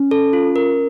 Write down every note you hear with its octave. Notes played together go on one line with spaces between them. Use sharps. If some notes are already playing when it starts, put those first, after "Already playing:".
Already playing: C#4
A4
F4
A#4